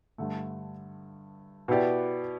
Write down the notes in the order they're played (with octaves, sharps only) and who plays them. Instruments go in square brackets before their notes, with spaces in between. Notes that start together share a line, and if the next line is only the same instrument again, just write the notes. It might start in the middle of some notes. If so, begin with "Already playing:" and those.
[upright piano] G2 D3 A3
B2 B3 E4 G4 D5